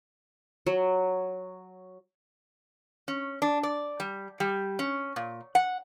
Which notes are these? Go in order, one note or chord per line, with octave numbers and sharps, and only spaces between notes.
F#3
C#4
D4
D5
G3
G3
C#4
A#2
F#5